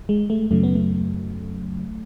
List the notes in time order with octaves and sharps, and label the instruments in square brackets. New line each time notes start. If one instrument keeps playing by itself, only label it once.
[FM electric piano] G#3
A3
F#2 C#3 F#3 A3
B3
A3